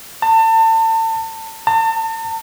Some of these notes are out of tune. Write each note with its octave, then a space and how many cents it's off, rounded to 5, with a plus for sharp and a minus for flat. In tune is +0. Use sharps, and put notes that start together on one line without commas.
A5 +35
A5 +40